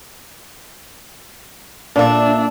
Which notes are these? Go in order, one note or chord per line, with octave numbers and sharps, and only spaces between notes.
A#2 D4 E5